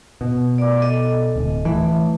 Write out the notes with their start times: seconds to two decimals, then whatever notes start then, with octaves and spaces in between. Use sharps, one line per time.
0.21 B2
0.58 D5 D6
0.80 A4 D#5
1.35 D1
1.65 E3 A3 E5